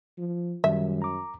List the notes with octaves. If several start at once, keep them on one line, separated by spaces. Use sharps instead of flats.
F3
F#2 D#3 G3 E5
A#5 D6